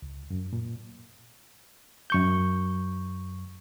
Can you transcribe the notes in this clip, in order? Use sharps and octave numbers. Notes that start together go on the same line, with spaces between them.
C#2
F#2
A#2
F#2 C#6 G6